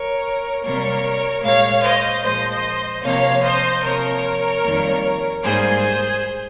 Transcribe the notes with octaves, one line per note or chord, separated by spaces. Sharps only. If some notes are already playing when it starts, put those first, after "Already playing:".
Already playing: A#4 C#5
C3 G3 A#3 A#4 C#5
A#2 G#3 C#5 F5
C5 D#5
A#2 F3 G#3 C5 D#5
C3 F3 A#3 C#5 F5
C5 D#5
C3 F3 A#3 A#4 C#5
F2 D#3 G3 A#3
G#2 G3 A#3 G#4 C5